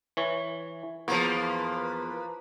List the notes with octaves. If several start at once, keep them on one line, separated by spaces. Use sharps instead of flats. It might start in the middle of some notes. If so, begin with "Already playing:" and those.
E3 C#5
E2 F3 A#3 B4